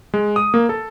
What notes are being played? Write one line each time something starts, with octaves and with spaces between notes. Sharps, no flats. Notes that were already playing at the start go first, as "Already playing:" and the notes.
G#3
D#6
A#3
A4